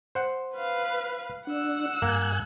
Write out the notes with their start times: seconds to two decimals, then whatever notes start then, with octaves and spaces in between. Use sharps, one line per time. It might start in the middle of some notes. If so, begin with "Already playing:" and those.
0.15 C5 F#5
0.55 B4 F5
1.47 D4 F#5 E6
2.02 G2 A#3 G#5 F#6